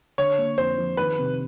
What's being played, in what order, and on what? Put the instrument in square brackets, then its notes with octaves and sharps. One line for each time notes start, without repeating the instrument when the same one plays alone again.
[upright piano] D3 [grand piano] C#5
[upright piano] A#3
[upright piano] F2 [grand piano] C5
[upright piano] F3
[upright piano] D#3 [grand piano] B4
[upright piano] C3